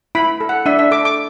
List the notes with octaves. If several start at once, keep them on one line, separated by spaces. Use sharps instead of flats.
E4 B5
A4
F#5
D4 E5
E5
A4 D6
D6